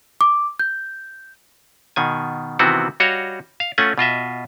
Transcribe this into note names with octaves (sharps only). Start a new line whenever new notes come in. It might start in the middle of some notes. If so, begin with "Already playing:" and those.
D6
G6
B2 D#3 G#5
C3 D#3 E3 B3 C4 F#4
G3 F#4 C#5 D#5 F5
F5
A3 C#4 F4 F#5 G#5
B2 F4 D#5 E5